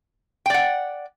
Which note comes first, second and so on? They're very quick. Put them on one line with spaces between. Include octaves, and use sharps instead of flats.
G5 D5 F#5